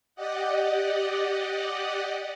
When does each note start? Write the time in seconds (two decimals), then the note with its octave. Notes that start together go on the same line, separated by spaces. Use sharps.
0.15 G4 D5 D#5 F#5